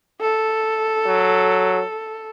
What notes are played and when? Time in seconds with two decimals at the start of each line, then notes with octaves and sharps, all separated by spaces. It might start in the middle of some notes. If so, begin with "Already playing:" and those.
0.21 A4
1.06 F#3